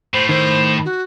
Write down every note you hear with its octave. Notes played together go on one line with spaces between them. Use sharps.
A2 C5
D#3 C5
F#4